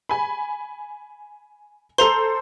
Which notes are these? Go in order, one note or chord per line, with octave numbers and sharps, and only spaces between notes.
G#5 B5
A4 C5 A#5 C6